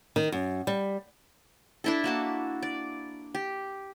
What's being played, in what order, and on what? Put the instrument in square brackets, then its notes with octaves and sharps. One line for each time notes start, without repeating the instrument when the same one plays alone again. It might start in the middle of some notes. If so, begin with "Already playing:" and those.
[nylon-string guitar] D#3
F#2
G3
[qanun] D4 E4 A4
A#3 F#4 A5
D5
G4